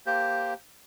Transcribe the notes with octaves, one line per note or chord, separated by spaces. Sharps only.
A#3 G4 C5